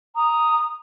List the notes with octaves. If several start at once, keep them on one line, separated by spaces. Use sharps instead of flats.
A#5 D#6